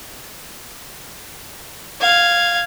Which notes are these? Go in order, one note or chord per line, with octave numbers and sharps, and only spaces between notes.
F5 G#6